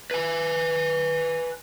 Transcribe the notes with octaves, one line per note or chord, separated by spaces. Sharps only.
B4 G#5